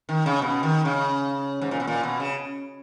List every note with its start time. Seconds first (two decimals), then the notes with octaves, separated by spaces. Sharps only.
0.09 D#3
0.26 C#3
0.42 B2
0.63 D#3
0.85 C#3
1.61 G#2
1.71 A#2
1.80 B2
1.87 A#2
2.03 B2
2.20 C#3